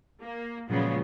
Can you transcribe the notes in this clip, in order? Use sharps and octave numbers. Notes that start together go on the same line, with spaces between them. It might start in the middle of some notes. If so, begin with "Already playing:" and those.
A#3
A#2 C#3 F3 F#3 G#3 B3